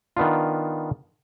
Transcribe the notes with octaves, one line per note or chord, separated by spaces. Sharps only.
D#3 B3 D4 F4